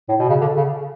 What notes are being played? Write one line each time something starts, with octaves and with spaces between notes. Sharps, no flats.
A2
B2
C#3
D3
C#3